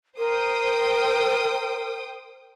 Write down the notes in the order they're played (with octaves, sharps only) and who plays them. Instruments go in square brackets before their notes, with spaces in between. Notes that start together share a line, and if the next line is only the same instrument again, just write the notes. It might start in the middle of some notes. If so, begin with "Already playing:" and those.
[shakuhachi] A#4 [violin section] C5 G5 D#6